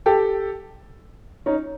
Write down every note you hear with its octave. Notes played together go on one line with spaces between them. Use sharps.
G4 A4
C#4 D#4